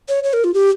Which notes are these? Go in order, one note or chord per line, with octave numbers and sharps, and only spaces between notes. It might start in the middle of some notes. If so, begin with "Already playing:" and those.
C#5
C#5
A#4
F4
G4